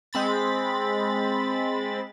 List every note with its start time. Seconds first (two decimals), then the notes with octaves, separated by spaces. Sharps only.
0.13 G#3 C4 B5 A6